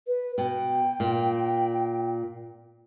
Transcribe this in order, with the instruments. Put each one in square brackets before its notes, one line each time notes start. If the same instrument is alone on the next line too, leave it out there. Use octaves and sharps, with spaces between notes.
[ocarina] B4
[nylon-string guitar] B2 [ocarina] G5
[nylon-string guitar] A#2